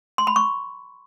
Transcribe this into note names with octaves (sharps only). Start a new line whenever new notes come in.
C6
B5
C#6